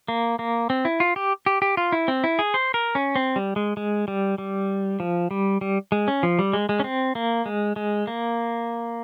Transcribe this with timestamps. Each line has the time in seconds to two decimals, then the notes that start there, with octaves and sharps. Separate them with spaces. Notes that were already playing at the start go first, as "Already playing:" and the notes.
0.08 A#3
0.39 A#3
0.70 C4
0.85 E4
1.00 F4
1.16 G4
1.46 G4
1.62 G4
1.77 F4
1.92 E4
2.08 C4
2.24 E4
2.39 G#4
2.54 C5
2.74 A#4
2.95 C#4
3.16 C4
3.36 G3
3.56 G#3
3.77 G#3
4.08 G3
4.38 G3
5.00 F3
5.31 G3
5.61 G3
5.92 G#3
6.08 C#4
6.23 F3
6.39 G3
6.53 G#3
6.69 G#3
6.80 C#4
6.84 C4
7.15 A#3
7.46 G#3
7.76 G#3
8.07 A#3